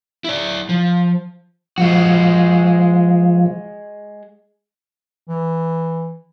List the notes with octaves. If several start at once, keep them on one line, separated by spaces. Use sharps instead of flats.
E4 D5
F3
F3 G#3 F#4
E3